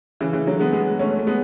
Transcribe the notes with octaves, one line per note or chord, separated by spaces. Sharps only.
C#3 E3
C#3 E3
D3 F#3
G#3 B3
G#3 B3
A3 C#4
A3
G#3 B3